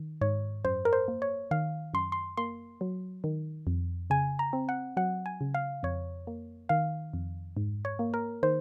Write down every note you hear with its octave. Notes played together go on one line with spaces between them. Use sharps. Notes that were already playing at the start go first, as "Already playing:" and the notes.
Already playing: D#3
G#2 C#5
F#2 C5
A#4
C5
A#3
C#5
D#3 F5
F#2 C6
C6
A#3 C6
F#3
D#3
F2
C#3 G#5
A#5
C4
F#5
F#3 F#5
G#5
C#3
F5
F2 C#5
A#3
D#3 F5
F2
G#2
C#5
A#3
A#4
D#3 C5